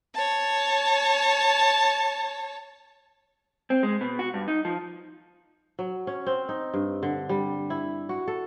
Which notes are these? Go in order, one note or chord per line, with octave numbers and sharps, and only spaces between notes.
C#5 A5
C4
G#3
B2
F#4
G2
D#4
F3
F#3
C#4
C4
D#4
G2
D3
G3
E4
F#4
A4